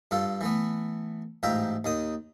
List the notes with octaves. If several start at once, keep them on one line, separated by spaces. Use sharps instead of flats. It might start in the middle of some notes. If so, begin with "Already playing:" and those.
G2 F4 A4
E3 A3 B3
A1 G#2 F4 E5 G5 A#5
D#2 D#3 D#6